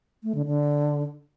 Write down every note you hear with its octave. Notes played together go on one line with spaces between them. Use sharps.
A3
D3
D3